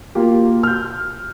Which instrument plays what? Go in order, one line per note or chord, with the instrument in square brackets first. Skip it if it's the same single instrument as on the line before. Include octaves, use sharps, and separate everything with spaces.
[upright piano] A#3 F4 G4
F6 G6